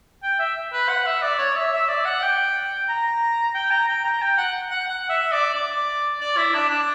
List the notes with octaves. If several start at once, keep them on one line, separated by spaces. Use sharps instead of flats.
G5
E5
B4
F#5
E5
D5
C#5
E5
E5
D5
F#5
G5
A#5
G5
A#5
G5
A#5
G5
F#5
F#5
F#5
E5
D5
D5
D5
E4
D4
D4